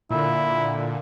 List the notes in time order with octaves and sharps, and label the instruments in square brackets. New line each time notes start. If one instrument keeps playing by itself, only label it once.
[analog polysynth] A#2 D3 [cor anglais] E4